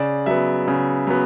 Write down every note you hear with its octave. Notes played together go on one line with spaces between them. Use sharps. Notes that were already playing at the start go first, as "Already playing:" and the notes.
Already playing: C#3 D5
F#3 B3 E5
C#3
F#3 B3